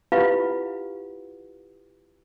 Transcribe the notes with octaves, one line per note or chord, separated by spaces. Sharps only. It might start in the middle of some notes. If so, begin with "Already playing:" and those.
E4 F4 G4 B4 F5 F#5